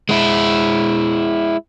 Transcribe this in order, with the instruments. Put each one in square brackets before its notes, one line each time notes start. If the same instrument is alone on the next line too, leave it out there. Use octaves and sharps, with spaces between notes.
[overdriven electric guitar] G#3 E4